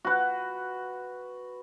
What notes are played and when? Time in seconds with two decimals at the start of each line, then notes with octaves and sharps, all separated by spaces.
0.04 F#4 B4